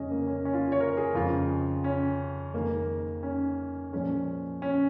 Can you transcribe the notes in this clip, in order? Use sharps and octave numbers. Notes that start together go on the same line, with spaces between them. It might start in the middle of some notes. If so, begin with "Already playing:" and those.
Already playing: F2 C#3 G#3 C#4 D#5
A#3
C#4
C#4
F4
C#5
A#4
G#4
F2 C#3 G#3 F4
C#4
F2 D#3 G#3 A#3
C#4
A#2 F3 G#3 C#4
C#4